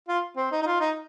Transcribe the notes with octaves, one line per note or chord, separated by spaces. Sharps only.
F4
C4
D#4
D#4
F4
D#4